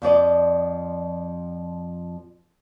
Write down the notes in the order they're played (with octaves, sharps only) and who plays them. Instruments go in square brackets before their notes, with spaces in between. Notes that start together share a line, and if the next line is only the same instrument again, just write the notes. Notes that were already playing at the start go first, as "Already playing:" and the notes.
[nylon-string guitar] F2 F3 D5 D#5